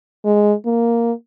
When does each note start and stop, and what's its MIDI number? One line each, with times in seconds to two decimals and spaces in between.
0.25 0.54 56
0.66 1.12 58